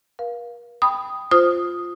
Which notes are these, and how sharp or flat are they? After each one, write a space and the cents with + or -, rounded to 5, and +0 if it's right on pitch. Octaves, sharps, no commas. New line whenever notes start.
A#4 +45 F5 +0
G5 +0 B5 +0 D#6 +5
F4 +0 C5 -5 D#6 +0